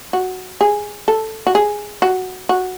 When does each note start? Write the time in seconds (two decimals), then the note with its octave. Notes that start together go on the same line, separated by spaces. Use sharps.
0.13 F#4
0.61 G#4
1.08 A4
1.47 F#4
1.55 G#4
2.02 F#4
2.49 F#4